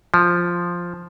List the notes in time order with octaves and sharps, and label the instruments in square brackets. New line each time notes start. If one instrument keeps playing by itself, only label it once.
[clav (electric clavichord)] F3